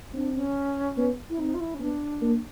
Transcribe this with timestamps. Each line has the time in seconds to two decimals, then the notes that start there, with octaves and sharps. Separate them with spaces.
0.14 C4 D4
0.35 C#4
0.97 B3
1.30 E4
1.39 C4 D#4
1.54 F4
1.60 E4
1.74 C#4
1.80 B3 D4
2.22 A#3